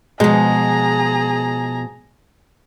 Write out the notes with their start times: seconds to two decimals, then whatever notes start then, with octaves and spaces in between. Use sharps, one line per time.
0.20 B2 F3 G#3 G#4 A#5